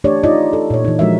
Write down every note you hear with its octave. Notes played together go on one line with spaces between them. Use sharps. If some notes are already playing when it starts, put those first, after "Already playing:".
E3 A3 D4 G4 C#5 D5
D#4 F4 D5 D#5
A4
A#2 C#5
E3 D#4
F3 G#3 D4 F#4 A#4 E5